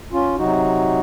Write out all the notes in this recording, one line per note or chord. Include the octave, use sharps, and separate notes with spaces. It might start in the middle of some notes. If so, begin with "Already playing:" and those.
C#4 F4
C3 F#3 D#4 F#4